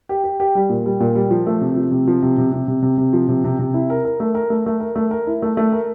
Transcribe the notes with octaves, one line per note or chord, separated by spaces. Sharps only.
G4
G4
G4
G3
A#2
G3
A#2
G3
F3
A3
C3
F3
C3
F3
C3
C3
C3
C3
C3
C3
F3
C3
C3
C3
E4
A#4
A#4
A3
A#4
A3
A3
A#4
A3
A#4
E4
A3
A3
A#4